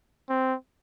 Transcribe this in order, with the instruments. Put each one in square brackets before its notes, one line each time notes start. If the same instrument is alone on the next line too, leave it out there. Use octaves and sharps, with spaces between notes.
[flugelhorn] C4